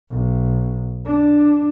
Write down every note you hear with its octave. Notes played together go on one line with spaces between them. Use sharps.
B1
D4